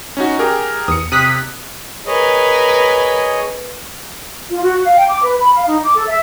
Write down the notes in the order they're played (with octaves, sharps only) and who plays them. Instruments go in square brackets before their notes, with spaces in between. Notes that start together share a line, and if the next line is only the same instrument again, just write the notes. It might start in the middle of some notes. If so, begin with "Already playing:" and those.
[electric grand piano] C#4 D#4 F#4
G4 G#4 A#4
[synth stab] E2 [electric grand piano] D#6 C#7
[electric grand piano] C3 [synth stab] D#6 F#6 B6
[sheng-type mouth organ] G#4 C#5 D#5 [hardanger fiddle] A#4 B4
[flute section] F4
F#4
F5
G5
D6
B4
B5
F5
D#4
D6
A4
E5